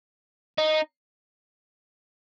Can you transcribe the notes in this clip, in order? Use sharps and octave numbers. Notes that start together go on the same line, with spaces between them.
D#4